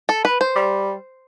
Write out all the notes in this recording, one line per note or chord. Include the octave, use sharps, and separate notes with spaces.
A4
B4
C5
G3